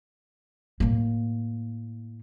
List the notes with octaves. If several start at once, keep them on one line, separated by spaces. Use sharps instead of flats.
A2 A#3